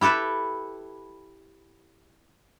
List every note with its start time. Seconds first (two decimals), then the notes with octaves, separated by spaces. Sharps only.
0.01 E4 G4 A4 B4 E5